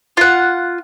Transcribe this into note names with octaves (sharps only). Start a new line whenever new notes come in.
F4 F#5